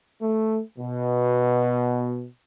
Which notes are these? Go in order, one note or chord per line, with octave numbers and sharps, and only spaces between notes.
A3
B2